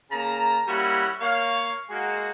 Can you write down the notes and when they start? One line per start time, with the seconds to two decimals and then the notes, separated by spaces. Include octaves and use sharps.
0.12 C#3 A#3 A5 A#5
0.67 G3 A#3 C#4 E4 F#4
1.20 A#3 C#5 F5
1.90 G#3 A#3 F#4